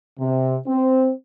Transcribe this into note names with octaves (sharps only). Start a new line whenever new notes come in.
C3
C4